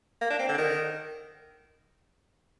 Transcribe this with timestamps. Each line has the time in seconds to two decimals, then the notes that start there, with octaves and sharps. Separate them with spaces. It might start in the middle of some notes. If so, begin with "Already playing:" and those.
0.21 A#3
0.30 D4
0.39 C4
0.49 D3
0.58 D#3